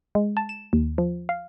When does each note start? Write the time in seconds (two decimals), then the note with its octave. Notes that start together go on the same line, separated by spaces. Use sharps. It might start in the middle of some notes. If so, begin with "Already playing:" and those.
0.15 G#3
0.37 A5
0.49 E7
0.73 D#2
0.98 F3
1.29 F5